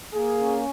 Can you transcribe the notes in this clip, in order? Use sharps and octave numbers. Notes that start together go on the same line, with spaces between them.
A#3 G#4
C#4